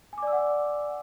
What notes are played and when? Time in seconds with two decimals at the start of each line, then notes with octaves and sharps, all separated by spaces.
0.13 G#5
0.18 D6
0.22 D5
0.27 E6
0.32 F#5